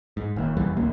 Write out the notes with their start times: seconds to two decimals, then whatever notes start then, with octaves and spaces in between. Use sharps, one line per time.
0.17 G#2
0.36 D#1 D#2
0.57 F1 E2 E3 G3
0.77 D1 A1 D2 A#3